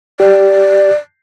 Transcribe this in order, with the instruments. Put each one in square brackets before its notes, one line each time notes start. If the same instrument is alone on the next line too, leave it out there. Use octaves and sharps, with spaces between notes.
[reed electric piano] G4 [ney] D5